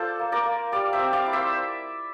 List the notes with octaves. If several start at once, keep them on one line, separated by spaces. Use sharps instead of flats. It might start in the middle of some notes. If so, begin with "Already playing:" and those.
Already playing: F4 A4 C5 D5
A#3
A#4 D5
A#3
G3 D5 F5
C5 E5
C4
D5 F5
E4
C5 E5